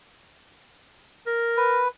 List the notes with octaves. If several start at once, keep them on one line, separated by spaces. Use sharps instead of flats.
A#4
B4